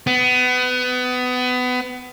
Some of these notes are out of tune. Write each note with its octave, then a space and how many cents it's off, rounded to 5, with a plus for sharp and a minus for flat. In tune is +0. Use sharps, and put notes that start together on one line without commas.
B3 +25